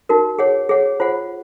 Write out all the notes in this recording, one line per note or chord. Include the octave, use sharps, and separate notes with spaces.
D#4 F#4 A#4
G#4 C#5 F#5
G#4 C#5 F#5
F4 C5 F#5